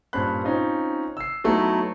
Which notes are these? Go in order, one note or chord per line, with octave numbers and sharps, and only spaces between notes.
G2 A#2 C#4 C5 B5 F#6
C4 C#4 D#4 F4 C5
E6 C7
F#3 A3 B3 D#4 E4